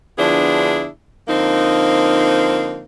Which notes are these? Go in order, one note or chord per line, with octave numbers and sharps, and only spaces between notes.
D3 F3 B3 D4 E4 G#4
D3 F3 A#3 C4 D#4